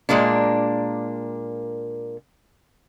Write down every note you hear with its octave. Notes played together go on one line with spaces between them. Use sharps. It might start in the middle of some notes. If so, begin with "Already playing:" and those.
A#2 G#3 A#3 D4